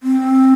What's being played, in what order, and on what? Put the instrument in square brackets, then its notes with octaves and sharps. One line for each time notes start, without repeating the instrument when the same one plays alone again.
[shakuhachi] C4